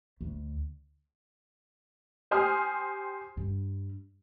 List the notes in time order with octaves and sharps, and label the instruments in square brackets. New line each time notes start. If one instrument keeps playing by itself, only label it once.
[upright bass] D2
[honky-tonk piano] G4 C5 G#5 D#6 F6
[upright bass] G2 G3